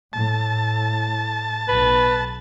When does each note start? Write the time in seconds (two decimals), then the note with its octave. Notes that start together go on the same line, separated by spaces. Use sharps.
0.13 A2 A5
1.68 B1 B4